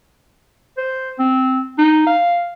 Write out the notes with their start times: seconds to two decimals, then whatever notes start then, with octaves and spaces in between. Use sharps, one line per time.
0.78 C5
1.19 C4
1.78 D#4
2.07 F5